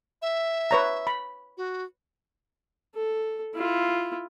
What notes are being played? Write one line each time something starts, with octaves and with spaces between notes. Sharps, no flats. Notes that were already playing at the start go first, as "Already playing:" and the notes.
E5
B4 C#5 A#5
B5
F#4
A4
E4 F4